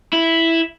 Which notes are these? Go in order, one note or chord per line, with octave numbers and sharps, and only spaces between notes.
E4